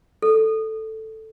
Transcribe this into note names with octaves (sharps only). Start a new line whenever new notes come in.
A4